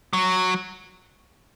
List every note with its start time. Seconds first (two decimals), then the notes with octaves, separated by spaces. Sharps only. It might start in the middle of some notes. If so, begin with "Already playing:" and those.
0.13 F#3